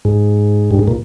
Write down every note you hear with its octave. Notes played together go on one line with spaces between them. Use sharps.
G#2
G2
G#2
A#2